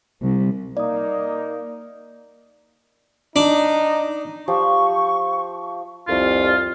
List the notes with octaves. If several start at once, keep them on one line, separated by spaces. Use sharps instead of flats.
C2
A#3 D#4 D5 D#6
D4 D#4
F3 G4 E5 C#6
C2 F2 F4